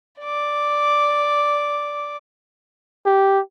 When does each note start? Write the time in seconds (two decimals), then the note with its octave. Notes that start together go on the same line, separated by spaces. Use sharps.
0.22 D5 D6
3.06 G4